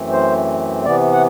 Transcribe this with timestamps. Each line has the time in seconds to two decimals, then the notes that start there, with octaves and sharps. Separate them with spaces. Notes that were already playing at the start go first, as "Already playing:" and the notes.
Already playing: F#2 E3 A3 C4
0.12 C5
0.85 C3 E3 B3 D5
1.13 F#5